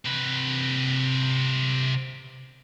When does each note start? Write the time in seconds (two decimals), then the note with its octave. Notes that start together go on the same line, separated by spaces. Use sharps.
0.05 C3 B4